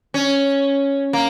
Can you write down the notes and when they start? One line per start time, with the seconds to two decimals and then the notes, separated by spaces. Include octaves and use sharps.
0.14 C#4
1.13 A#3